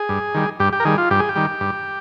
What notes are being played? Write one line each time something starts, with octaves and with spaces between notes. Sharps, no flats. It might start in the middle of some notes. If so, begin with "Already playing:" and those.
Already playing: G#4
G2
D#3 G3
G2 G4
G4
A#4
D#3 G3 G#4
F4
G2 G4
G#4
G4
D#3 G3
G2